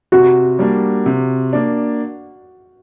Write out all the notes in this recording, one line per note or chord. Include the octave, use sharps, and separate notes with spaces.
C3 F#4
G3 A#3 D4
C3
A#3 D4